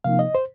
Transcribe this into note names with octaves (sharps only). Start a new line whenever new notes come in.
C3 F3 A#3 D#4 F5
D#5
C5